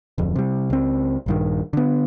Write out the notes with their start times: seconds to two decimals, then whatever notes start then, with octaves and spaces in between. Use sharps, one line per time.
0.18 D1 F2
0.36 C3 G3
0.70 C#2 C4
1.26 A#1 G2 D#3
1.73 D3 B3